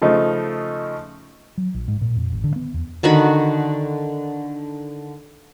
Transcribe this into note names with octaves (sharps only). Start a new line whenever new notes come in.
C#3 F3 A3 D#4
F#3
A#1
G#2
A#2
F2
G#1
D3
B3
E2
D3 D#3 F#4 B5